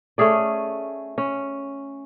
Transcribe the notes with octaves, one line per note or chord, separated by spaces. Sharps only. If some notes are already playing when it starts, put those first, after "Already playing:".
A3 C#4 G#4 D5
C#4